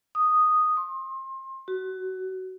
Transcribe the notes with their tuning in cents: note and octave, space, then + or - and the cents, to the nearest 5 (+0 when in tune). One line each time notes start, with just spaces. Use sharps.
D#6 -5
C6 +30
F#4 +20